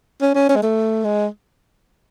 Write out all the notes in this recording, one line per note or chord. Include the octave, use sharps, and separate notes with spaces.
C#4
C#4
C#4
G#3
A3
G#3